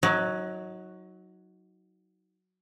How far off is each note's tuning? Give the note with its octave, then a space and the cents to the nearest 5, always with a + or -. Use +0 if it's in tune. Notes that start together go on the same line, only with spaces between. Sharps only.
F#3 +0 D#4 +30